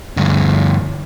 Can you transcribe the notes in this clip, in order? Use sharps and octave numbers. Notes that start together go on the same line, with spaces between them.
D2 G2